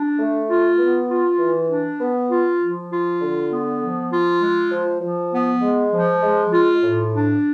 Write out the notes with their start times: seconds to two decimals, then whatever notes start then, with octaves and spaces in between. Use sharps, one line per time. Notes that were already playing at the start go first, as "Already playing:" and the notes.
Already playing: D4
0.19 A3
0.49 F4
0.79 B3
1.09 F4
1.39 E3
1.70 D4
2.00 B3
2.30 F4
2.60 F3
2.90 F4
3.21 D3
3.51 B3
3.81 F3
4.11 F4
4.41 G#3
4.72 F3
5.02 F3
5.32 B3
5.62 G#3
5.92 F3
6.22 G#3
6.52 F4
6.83 A2
7.13 D4